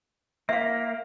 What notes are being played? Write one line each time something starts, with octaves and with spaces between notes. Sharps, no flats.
A#3 E5 F5